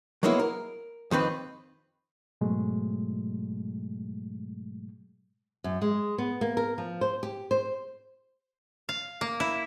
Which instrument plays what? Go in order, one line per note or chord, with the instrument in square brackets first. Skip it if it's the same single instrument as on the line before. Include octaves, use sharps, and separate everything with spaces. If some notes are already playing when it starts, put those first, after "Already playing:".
[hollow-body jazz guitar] F#3 G#3 A#3 B3 E4
A#4
F2 D#3 C4 B4
[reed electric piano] G#2 B2 F#3 G#3 A3
[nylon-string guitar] F#2
G#3
B3
A#3
A#4
F3
C5
G4
C5
[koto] F5
A#3
E4